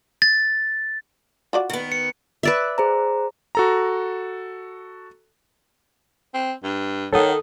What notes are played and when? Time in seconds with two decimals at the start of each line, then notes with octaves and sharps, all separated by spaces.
0.22 A6
1.53 F4 F#4 D5
1.70 D#3 B3
1.92 C#7
2.43 B4 D5 E5
2.78 G#4 C5 A#5
3.55 F#4 A4 A#5
6.34 C4
6.64 G2
7.13 D#3 A4 C#5 F#5 D#6